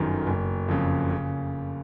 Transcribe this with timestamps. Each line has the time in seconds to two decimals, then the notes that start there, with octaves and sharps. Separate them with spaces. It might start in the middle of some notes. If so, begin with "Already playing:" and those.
Already playing: G1 F#2 D#3
0.27 F#1
0.68 F2 C#3
1.11 C#3